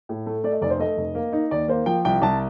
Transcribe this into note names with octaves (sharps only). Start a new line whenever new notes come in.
A2
A3
A3 D5
D#5
F1 D5
C5
A3 D#5
F1
A#3
D#4
D#2 D5
A#3 C5
F3 G5
C2 G5
C2 A5